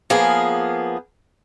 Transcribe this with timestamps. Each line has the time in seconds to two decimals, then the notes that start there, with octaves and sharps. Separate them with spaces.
0.10 F3 A#3 B3 G#4